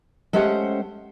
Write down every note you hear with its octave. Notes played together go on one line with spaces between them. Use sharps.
G#3 A3 C#4 G4 C5 F#5